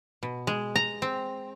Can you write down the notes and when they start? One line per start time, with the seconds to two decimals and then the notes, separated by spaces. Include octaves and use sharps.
0.23 B2
0.47 G#3
0.76 A#5
1.02 C4